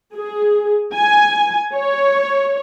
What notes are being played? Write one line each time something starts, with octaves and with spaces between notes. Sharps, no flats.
G#4
G#5
C#5